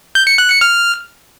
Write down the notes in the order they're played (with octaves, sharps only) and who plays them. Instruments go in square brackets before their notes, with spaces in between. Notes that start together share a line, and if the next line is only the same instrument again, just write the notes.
[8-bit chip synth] G6
C#7
F#6
C#7
F6